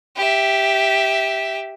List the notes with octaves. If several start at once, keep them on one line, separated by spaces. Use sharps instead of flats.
G4 E5